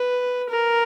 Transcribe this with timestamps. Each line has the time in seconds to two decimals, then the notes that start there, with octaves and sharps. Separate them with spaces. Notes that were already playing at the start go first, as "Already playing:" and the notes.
Already playing: B4
0.50 A#4